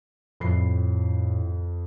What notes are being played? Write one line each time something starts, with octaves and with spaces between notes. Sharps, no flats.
F2 A2 B5 C7